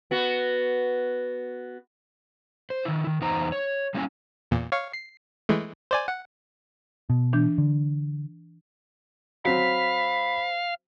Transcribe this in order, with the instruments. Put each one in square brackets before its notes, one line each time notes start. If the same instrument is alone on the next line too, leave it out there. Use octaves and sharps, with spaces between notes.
[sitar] B3 F#4
[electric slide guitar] C5
D#3 E4
D#3
E2 D#4 C5 A#5
C#5
G3 A#3 C#4 E4 C5 G#5
[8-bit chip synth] E2 A#2
C#5 F5 C#6
C7
E3 G#3 A3
C5 D5 G#5
F#5
[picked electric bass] B2
[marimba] E3 D4 G6
[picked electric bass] D3
[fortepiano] F#3 C4 [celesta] C5 B6 [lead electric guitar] F5 [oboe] B5